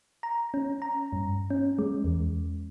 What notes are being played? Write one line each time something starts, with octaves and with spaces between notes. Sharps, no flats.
A#5
C#4
A#5
G2
C#4
G#3
E2